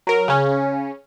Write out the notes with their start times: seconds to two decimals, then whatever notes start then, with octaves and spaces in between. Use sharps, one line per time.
0.07 F#3 A#4
0.28 C#3 C#4